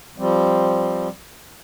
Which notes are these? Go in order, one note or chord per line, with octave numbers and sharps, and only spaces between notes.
F3 G3 C4